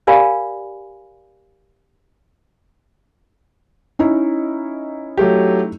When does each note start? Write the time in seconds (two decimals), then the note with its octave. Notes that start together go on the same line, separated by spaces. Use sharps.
0.07 G4 A#4 D5 F5 G#5 B5
3.99 C#4 D#4 E4
5.18 F#3 A3 G4